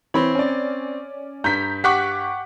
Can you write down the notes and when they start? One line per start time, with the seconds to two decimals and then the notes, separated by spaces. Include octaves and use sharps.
0.14 E3 C4 C#5 B5
0.35 C#4 D5
1.44 G2 A#5 G6 B6
1.84 G4 F#5 C#6 D6 F#6 B6